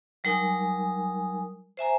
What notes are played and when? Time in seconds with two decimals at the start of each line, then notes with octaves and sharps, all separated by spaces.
0.24 F#3 G3 D#4 A#4 G#5 D#6
1.77 C5 E5 G#5 A#5